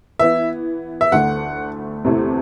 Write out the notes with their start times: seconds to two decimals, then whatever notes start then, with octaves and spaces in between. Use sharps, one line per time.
0.19 E3 B3 E4 E5
1.01 E5
1.12 D2 D3 A3 D4 F#5
2.04 E2 C3 E3 A3 E4